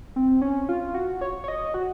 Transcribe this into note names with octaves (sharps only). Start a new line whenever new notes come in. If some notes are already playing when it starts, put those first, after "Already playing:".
C4
C#4
F4
F#4
C#5
C#5
D#5
F#4